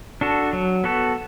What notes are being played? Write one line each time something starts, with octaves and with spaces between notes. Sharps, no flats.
D4 F#4 A4
F#3
B3 F#4 A4